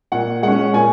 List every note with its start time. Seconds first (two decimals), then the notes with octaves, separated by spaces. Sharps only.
0.12 A#2 F#5
0.43 G#3 C#4 F#5
0.73 A#2 G#5